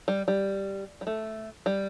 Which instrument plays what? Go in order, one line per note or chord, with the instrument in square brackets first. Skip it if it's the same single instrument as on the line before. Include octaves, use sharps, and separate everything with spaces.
[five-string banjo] G3
G3
G3
A3
G3